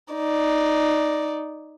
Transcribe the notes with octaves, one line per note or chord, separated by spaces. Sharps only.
D#4 D5